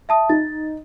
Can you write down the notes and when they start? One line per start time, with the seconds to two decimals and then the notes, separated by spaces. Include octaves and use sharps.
0.09 E5 A5 D#6
0.29 D#4 A6